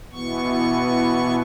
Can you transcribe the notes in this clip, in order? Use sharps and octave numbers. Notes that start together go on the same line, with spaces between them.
B2 E3 B3 C#6